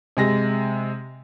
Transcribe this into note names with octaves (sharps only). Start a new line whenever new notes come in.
C3 G#3 A#6